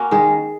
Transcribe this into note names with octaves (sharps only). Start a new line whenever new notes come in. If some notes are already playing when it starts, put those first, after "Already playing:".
Already playing: A#3 C#4 F#4
D#3 G#3 G#4